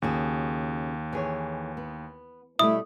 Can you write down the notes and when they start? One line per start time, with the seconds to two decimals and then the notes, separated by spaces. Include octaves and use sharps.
0.02 D#2 C#3 F#4 G#4
1.13 E3 G#4 C#5
1.77 B3
2.59 B2 G3 A3 E4 D#6